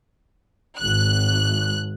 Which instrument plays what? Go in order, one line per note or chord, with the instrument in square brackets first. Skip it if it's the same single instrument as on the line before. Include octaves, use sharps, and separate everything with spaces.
[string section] G#1 F#6